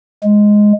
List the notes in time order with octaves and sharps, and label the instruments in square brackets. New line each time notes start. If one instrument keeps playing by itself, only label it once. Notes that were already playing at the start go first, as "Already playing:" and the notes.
[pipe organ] G#3